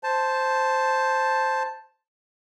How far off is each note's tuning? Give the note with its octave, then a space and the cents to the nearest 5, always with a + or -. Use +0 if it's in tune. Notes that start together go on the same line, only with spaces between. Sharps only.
C5 +0 A5 +0